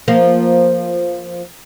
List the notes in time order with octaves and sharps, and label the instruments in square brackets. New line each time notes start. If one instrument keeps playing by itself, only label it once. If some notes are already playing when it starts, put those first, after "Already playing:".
[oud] F3 A#3